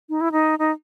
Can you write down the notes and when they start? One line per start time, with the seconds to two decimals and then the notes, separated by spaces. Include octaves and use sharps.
0.09 D#4
0.21 E4
0.32 D#4
0.59 D#4